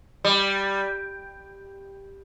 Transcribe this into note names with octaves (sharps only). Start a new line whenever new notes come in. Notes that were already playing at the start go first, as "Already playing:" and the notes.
G3